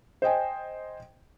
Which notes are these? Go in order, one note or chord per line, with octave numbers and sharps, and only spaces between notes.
C5 D#5 G5 G#5